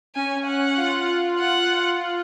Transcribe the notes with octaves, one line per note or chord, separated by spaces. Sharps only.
C#4 G#5
F#5
F4
F#5